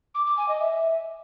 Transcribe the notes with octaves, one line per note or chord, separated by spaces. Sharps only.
D6
D6
G#5
D#5
E5